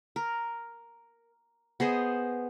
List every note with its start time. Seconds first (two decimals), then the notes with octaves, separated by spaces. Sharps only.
0.16 A#4
1.80 B3 G#4 C5 D#5